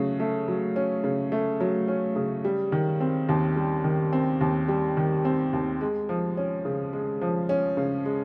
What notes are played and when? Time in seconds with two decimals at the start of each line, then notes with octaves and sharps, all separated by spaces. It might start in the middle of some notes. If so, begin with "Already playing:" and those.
Already playing: C#3 F#3 A3 C#4
0.20 A3
0.48 F#3
0.76 C#4
1.04 C#3
1.32 A3
1.60 F#3
1.88 C#4
2.16 C#3
2.44 G3
2.72 D#3
3.00 C4
3.29 D#2
3.56 G3
3.84 D#3
4.13 C4
4.41 D#2
4.68 G3
4.97 D#3
5.25 C4
5.53 D#2
5.81 G#3
6.09 F3
6.37 C#4
6.65 C#3
6.93 G#3
7.21 F3
7.49 C#4
7.77 C#3
8.05 G#3